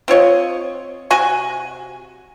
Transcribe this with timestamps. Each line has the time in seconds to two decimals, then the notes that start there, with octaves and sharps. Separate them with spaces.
0.08 C4 F4 C#5 D#5
1.10 C3 F#4 G#5 C#6